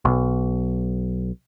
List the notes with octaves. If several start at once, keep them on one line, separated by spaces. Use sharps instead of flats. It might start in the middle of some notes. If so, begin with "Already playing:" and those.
B1